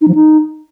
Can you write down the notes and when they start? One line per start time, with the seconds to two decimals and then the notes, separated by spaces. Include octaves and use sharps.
0.01 D#4
0.08 F3
0.15 D#4